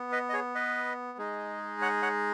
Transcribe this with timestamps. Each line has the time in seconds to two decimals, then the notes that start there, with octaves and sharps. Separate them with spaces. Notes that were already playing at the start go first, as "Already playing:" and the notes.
Already playing: B3
0.12 B4 D#5
0.29 D#5
0.33 G#4 C#5
0.55 B4 D#5
1.18 G#3 D#4 G#4
1.81 C#5 F#5
2.02 C#5 F#5